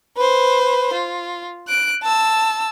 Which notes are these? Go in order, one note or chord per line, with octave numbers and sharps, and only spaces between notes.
B4 C5
F4
F#6 D7
A5 E6